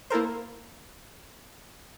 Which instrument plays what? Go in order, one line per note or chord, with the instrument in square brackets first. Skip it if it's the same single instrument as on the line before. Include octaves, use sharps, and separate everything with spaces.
[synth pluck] A#3 E4 A4 A#4 C5